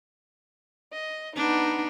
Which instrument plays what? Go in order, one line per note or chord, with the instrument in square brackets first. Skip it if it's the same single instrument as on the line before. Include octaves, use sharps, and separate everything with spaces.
[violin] D#5
[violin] B3 D#4 [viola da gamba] D4